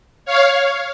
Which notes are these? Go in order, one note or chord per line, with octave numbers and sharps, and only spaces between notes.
C#5 F5